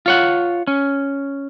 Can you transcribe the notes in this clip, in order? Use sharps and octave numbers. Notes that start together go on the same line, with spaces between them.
F4 C#5 F#5
C#4